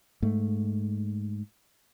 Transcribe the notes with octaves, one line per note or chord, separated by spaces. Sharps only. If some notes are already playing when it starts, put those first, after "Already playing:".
G#2 A3